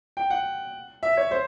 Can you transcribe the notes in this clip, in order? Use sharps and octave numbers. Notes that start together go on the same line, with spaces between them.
G5
F#5
E5
C#5
C5